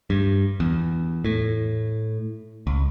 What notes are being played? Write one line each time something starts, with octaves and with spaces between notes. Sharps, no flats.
G2
E2
A2
C#2